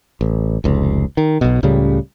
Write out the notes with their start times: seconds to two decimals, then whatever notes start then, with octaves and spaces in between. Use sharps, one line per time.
0.21 A1
0.64 F1 C#2
1.17 D#3
1.41 B1 B2
1.63 C#2 A2 C#3 G3